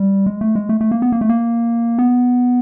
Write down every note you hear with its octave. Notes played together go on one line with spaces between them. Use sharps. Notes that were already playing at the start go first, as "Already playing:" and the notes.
Already playing: G3
G#3
A3
G#3
A3
A3
A#3
B3
A#3
A3
A#3
B3